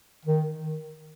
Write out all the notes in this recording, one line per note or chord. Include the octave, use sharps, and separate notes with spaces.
D#3